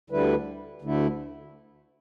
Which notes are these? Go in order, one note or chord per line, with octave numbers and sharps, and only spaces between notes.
D2 D3 G3 E4 B4
D2 D3 A3 E4